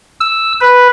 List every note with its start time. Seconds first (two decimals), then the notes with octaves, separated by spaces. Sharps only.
0.21 E6
0.61 B4